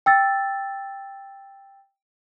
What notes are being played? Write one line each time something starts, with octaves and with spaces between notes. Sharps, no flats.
G5 E6 A6